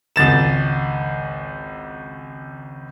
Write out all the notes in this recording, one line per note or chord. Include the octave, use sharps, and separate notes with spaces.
G#1 C#2 A6 E7